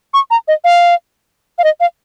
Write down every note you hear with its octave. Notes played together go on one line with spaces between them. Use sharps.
C#6
A#5
D#5
F5
F5
D#5
F5